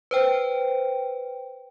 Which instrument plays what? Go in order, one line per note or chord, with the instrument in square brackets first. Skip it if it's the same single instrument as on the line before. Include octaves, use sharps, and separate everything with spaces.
[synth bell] B4 C5 G5